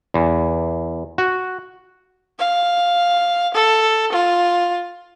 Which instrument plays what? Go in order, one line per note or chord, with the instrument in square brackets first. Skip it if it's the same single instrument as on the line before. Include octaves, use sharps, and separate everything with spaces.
[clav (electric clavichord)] E2
F#4
[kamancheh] F5
A4
F4